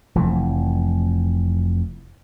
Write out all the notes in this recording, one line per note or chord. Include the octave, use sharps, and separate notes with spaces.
F1 F2 E3